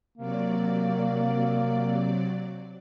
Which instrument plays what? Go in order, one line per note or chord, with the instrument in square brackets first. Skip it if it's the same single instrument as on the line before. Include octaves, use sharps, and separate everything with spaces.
[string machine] C3 F#3 D5 [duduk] A#3